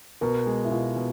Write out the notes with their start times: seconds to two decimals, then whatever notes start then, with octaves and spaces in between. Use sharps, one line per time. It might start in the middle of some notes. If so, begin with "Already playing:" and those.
0.21 B2 A#4
0.46 G#3
0.65 E4
0.71 B2 F4
0.96 B2